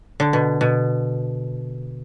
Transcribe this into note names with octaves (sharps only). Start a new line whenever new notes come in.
D3
B2
B2